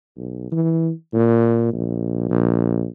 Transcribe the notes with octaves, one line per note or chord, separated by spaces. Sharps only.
B1
E3
A#2
A#1
A#1